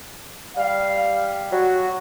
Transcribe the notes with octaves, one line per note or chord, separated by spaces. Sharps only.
G3 F5
F#3 F#4